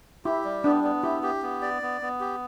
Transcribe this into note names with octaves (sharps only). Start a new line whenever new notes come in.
E4 G4
G3
B3 D4
B3
E4 G4
G4
B3
D5
B3
B3
G4